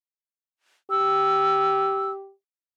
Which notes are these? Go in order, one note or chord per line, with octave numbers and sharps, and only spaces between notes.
G4 E6